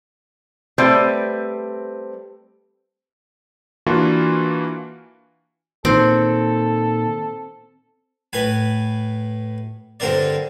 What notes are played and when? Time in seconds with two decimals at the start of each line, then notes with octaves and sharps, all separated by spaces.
0.78 G3 A3 C4 B4 C5 D5
3.87 E3 A#3 D4 F4 F#4
5.85 A#2 D#3 C4 A4
8.33 A2 B4 G#5
10.00 G2 D3 C4 A#4 D5